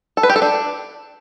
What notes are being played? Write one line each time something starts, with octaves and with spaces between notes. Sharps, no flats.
A4
B4
G4
A4
D4